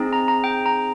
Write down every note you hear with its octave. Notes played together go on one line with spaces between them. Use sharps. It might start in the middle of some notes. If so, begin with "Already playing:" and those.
Already playing: C4 D#4 G#4
A#5
A#5
G5
A#5